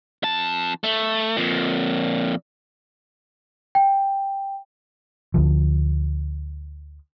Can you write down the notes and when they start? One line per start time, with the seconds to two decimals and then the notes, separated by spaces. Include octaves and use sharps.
0.23 F2 A5
0.84 A3
1.37 F2 A#2
3.75 G5
5.34 D2 D3 F3